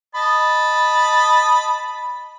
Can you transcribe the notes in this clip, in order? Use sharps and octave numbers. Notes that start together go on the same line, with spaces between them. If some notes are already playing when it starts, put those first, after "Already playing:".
D#5 A5 B5